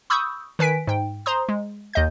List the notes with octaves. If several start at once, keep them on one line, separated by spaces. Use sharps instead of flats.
B5 C#6 D#6 E6 G6
D#3 B4 G#5 B6 D7
G#2 G5
C5 A#5 C6 D#6
G#3
D#2 D#5 G6